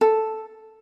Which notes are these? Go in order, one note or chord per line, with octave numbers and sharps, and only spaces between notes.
A4